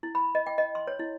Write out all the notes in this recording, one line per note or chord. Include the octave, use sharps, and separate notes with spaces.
E4
B5
D#5
G5
D#5
C6
C#5
E4